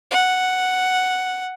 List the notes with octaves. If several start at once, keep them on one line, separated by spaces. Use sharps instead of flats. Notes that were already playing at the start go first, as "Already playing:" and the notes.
F#5